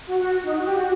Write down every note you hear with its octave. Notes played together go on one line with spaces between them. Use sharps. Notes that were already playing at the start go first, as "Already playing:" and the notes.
F#4
F#4
D#4
F#4
G4
F#4